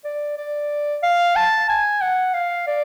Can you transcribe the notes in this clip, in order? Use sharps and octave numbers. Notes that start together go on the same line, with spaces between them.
D5
D5
F5
A5
G#5
F#5
F5
D5